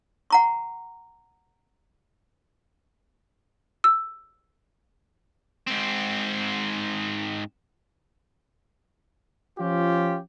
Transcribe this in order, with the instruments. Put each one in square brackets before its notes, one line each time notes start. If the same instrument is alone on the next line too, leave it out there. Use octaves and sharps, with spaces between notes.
[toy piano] F#5 A#5 C#6
[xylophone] E6
[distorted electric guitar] G#2 C4
[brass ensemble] F3 C#4 F4 G4